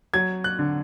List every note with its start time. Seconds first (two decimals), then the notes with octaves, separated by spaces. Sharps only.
0.14 F#3 G#6
0.44 F#6
0.59 D3